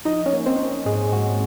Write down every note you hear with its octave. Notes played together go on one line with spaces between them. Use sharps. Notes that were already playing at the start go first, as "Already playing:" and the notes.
F3 D#4 D#5
C#4 C#5
A#3
C4 C5
C#4
G#2 G#3 G#4
G#2 F#4